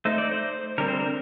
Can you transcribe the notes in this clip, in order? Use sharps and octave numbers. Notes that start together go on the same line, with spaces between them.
A3 D#4 C5
D5
C5
D3 G3 C4 A#4
C5
A#4